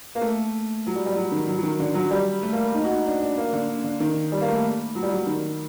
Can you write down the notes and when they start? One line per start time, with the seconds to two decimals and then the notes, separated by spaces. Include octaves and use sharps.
0.15 A#3
0.21 A3
0.87 F#3
0.96 G3
1.06 G3
1.16 F#3
1.32 D#3
1.47 F#3
1.58 F#3
1.63 D#3
1.80 D3
1.94 F#3
2.11 G3
2.43 A3
2.52 A#3
2.74 D#4
2.84 F#4
2.95 D#4
3.06 D4
3.21 D4
3.37 A#3
3.53 D3
3.84 D3
4.00 D#3
4.32 G3
4.41 A#3
4.48 A3
4.95 F#3
5.03 G3
5.10 F#3
5.27 D#3